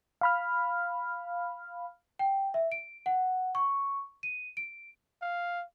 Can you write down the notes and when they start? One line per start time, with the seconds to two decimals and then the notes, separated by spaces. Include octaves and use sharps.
0.21 F5 B5 F6
2.19 G5
2.54 E5
2.72 D7
3.06 F#5
3.55 C#6
4.23 D#7
4.57 D7
5.22 F5